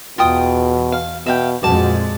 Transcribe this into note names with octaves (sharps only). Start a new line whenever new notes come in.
E2 B2 F4 G5 D#6
F5
B2 E5 F5 G5
F2 A#2 G#3 F#4 D5 A5